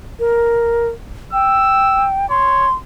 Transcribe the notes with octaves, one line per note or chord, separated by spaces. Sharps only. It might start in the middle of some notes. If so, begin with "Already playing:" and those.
A#4
G5 E6
C#5 C6